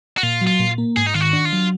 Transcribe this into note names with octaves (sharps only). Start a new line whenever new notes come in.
F#4
A#2 F4
F#3
F4
A#2
A#3
G#2 G#4
D#4
D#3 F4
F#4
D4
F4
F#3